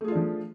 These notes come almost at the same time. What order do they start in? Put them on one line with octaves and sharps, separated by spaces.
A3 G#4 F4 D4 F3